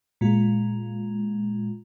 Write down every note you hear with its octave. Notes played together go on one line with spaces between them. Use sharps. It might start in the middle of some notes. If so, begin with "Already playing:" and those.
A#2 G#3 F4